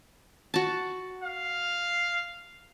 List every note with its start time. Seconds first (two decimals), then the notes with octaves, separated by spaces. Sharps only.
0.54 F#4 A5
1.23 F5